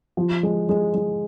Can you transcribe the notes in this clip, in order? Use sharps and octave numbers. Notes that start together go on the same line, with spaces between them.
F3
G#3
G#3
G#3